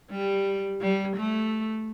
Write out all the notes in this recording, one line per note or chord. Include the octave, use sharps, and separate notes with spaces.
G3
G3
A3